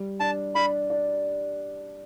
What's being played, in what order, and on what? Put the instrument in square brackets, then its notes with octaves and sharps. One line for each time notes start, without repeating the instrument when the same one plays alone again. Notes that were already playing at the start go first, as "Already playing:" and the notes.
Already playing: [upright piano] G3
[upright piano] D4 [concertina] A5
[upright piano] D4 [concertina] B5
[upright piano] D4